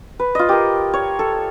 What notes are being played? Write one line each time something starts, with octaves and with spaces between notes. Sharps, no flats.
B4
F4 D#5
G4 A#4
C#5
A4